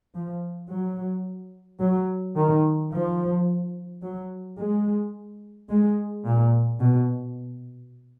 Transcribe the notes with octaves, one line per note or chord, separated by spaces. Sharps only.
F3
F#3
F#3
D#3
F3
F#3
G#3
G#3
A#2
B2